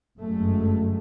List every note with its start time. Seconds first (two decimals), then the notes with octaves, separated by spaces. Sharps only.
0.18 G1 F#2 F#3 G#3 A3